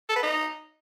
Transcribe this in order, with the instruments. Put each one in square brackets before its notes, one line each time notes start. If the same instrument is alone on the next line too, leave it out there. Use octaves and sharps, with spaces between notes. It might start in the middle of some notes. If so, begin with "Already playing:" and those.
[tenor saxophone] A4
B4
D#4